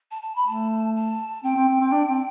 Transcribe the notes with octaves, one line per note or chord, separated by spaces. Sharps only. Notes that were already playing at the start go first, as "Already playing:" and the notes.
A5
A5
B5
A3 A5
A5
C4 G5
C4
C4
C4
D4
C4